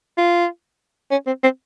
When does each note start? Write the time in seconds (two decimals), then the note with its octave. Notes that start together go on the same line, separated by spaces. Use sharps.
0.17 F4
1.11 C#4
1.26 C4
1.43 C4